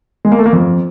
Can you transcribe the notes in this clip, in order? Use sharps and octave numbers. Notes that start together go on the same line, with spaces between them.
G#3
A#3
A3
A#3
F2